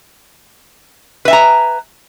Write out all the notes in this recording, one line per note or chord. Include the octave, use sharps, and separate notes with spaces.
B4 E5 G#5 A#5